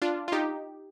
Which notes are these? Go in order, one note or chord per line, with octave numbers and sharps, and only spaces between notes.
D4 F4
F4
D#4 G4